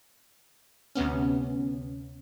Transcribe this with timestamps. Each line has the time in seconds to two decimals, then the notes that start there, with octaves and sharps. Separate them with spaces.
0.95 D2 C3 B3 C#4